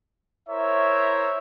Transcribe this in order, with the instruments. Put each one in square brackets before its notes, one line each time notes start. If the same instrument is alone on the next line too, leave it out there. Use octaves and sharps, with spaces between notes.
[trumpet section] E4 A#4 C5 C#5 E5